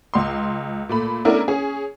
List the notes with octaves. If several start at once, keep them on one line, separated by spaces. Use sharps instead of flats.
C#2 C6
A#2 A3 B5
A3 B3 C#4 D4 E4 A#4
C#4 G#4